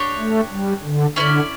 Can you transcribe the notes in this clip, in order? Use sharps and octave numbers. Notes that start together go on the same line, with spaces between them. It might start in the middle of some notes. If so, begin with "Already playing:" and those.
Already playing: D4 G4 C#5
A3
G3
D3
D3 C#4 E4 B4 D5